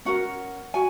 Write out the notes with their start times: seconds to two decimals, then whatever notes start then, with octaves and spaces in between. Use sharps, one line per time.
0.05 C#4 F#4 A#4 F#5
0.74 F#4 G#5